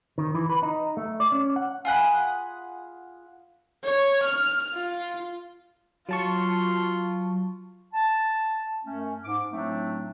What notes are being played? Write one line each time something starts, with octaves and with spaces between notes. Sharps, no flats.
D#3
E3
B4
D#4
A3
D5
C#4
F#5
F4 G#4 F#5 B5
C#5
F6
F4
F#3 F4 A5 C#6
A5
F#2 A3 C#4
G#2 D6
A2 F#3 A3 C4 D4 D#4